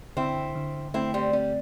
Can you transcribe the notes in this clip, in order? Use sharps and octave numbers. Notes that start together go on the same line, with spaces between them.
D3 C4 E4
D3
A3 C4 E4
G3 C4
G3 C4